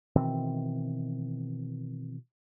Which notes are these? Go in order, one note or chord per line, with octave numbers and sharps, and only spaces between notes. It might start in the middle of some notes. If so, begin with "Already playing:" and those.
B2 D#3 E3 C4